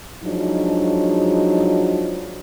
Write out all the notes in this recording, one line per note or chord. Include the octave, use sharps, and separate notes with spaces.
F3 F#3 G#3 D4 D#4